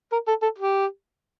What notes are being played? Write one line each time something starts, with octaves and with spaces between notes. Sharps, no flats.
A#4
A4
A4
G4